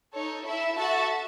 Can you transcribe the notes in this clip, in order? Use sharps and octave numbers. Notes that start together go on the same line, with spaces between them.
D#4 A4 C#5
E4 A4 E5
F#4 A4 E5 A5